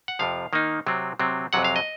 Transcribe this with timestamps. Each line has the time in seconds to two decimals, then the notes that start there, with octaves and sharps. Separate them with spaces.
0.08 F#5
0.19 F2 C3 F3 F5
0.53 D#3 A#3 D#4
0.87 C3 F#3 C4
1.19 C3 F#3 C4
1.53 F2 C3 F#3 F#5
1.64 F5
1.76 D#5